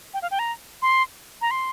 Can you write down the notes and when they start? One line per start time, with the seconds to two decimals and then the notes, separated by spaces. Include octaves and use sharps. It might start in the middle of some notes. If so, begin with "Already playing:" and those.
0.14 G5
0.22 F5
0.31 G5
0.39 A#5
0.82 C6
1.41 A#5
1.51 C6